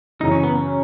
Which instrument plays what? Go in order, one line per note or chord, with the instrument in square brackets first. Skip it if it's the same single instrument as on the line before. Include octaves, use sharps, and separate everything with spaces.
[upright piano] F#2 C#3 E3 [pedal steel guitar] D#4
[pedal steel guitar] C#4
B3
C#4